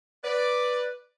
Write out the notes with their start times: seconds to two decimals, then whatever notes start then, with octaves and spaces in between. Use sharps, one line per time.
0.23 B4 D5